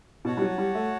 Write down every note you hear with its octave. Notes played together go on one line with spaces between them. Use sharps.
B2 F#4 C#5 F#5 A5
G3
F#3
G3
A3